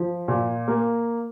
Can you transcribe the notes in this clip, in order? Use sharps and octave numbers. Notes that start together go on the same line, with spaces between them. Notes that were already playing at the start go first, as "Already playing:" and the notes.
Already playing: F3
A#2
A#3